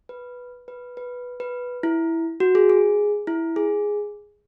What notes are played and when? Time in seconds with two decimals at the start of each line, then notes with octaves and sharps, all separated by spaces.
0.09 B4
0.68 B4
0.97 B4
1.40 B4
1.83 E4
2.40 F#4
2.55 G#4
2.70 G#4
3.27 E4
3.56 G#4